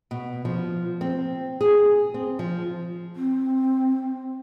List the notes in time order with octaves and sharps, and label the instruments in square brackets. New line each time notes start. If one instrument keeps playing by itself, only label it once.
[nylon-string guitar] B2
F3
C4
G#4
C4
F3
[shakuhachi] C4